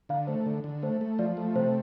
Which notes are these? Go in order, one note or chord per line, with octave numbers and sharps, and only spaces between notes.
D3 F5
A3 C5
D3 A4
D3
A3 C5
A3
F3 D5
A3
C3 C5